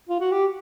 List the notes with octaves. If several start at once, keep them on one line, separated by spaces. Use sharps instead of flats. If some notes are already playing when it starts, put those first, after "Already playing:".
F4
F#4
G4